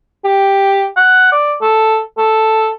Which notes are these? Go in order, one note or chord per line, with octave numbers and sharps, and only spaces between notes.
G4
F#5
D5
A4
A4